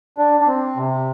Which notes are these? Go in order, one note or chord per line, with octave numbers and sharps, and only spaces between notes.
D4
D4
C4
C3